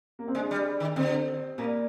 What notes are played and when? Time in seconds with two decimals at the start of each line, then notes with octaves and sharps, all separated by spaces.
0.19 A#3
0.28 C4
0.35 G#3 D4
0.51 G3
0.80 D#3
0.96 D3 C4
1.58 A#2 A#3